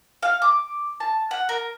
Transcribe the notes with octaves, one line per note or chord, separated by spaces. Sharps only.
F5
D6
A5
F#5
A#4